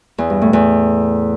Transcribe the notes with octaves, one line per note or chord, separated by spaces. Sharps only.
E2
G2
A2
E2